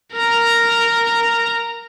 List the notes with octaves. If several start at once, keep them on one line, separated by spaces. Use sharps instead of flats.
A#4 A#5